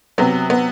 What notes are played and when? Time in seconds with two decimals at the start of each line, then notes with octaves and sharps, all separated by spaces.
0.18 C3 F#3 B3
0.50 B3